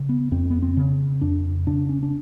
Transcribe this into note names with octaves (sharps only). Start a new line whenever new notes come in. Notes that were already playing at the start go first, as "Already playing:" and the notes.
Already playing: C#3
B3
F2 C4
B3
C4
C#3
F2 D4
C#3 D4
C#4
D4